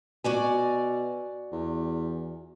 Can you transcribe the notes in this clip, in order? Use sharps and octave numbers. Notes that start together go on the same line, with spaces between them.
B2 F#4 D5 G#5
E2